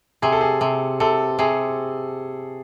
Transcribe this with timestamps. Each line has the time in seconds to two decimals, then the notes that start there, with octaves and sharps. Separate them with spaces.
0.22 C3 G#4
0.32 A4
0.41 G#4
0.61 C3
1.00 C3 A4
1.39 C3 G#4